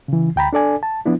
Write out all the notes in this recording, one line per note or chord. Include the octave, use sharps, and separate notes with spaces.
C#3 E3
D2 G5 A#5 B5
D4 A4 D5 G#5
A5
F3 B3 D4 E4